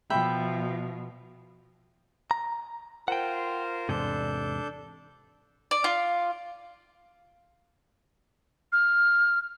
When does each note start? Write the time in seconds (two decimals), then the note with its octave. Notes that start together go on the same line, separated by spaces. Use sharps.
0.10 B2 F3 E5 G5 B5
2.31 A#5
3.08 F4 A#4 C5 F#5 G5
3.89 E2 G#2 C3 D4 A4 G6
5.71 D5
5.84 F4
8.72 F6